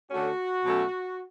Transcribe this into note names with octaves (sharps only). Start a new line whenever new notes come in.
D3 A3 C#4 F#4
B2 F#3 A3 C#4